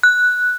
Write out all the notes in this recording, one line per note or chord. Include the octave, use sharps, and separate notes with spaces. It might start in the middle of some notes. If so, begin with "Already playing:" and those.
F#6